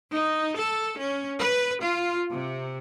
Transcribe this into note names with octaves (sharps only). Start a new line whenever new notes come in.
D#4
A4
C#4
B4
F4
C3